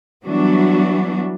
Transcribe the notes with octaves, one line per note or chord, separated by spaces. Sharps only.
E3 F#3 G3 B3 D4 F#4